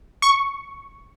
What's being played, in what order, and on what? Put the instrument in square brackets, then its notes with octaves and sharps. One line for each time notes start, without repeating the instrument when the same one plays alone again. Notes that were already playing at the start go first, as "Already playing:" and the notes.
[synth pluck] C#6